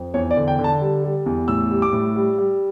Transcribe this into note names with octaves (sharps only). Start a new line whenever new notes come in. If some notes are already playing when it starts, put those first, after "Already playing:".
Already playing: F2
E2 C#5
D5
D3
G5
D3
A5
G3
G3
E2
A2 E6
G3
D6
A2
G3
G3